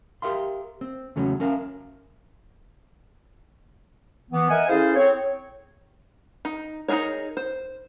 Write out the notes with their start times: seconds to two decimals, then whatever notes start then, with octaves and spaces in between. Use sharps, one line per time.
0.22 G4 A#4 E5 F5 C6
0.81 C4
1.16 E2 C#3 F#3 A3 C#4
1.40 C#4 A#4 E5 F5
4.31 E3 B3
4.49 A#4 D#5 E5 F#5 G#5
4.69 C#4 E4 G#4 A4 C5 F5
4.95 C4 C#5
6.45 D#4
6.88 D#4 E4 G#4 A#4 C#5
7.37 C5